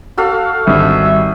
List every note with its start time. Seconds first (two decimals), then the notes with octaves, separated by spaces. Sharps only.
0.17 F#4 A4 F5
0.67 G#1 G3 E5